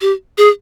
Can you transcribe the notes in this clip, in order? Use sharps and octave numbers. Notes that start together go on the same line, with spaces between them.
G4
G#4